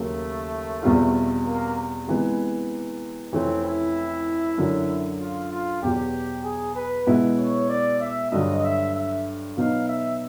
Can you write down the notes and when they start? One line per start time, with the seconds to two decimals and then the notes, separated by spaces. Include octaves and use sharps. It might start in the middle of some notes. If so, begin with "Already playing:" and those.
Already playing: D#2 C#3 F#3 A3 A#3
0.83 E2 B2 G3 C4 F4
1.46 A#3
2.08 C3 E3 G#3 B3
3.32 F2 C3 E3 A3 C4 C#4
3.65 E4
4.58 F#2 D3 F#3
5.21 F4
5.52 F4
5.82 E2 B2 F#3 G4
6.45 G#4
6.76 B4
7.07 B2 G#3 B3 E4
7.38 C#5
7.69 D5
8.01 E5
8.32 G2 D3 F#3 D#5
8.64 E5
8.94 E5
9.57 B2 F#3 B3 D#4 F5
9.88 E5